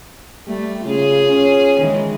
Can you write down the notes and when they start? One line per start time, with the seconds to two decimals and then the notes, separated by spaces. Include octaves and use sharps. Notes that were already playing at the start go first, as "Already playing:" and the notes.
0.47 G3 A3
0.86 C#3 F4 G#4
1.29 C#4
1.79 D#3 E3 G#3